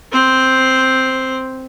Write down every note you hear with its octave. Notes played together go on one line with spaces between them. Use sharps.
C4 C5